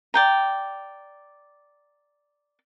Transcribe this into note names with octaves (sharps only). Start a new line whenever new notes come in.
D5 G5 A#5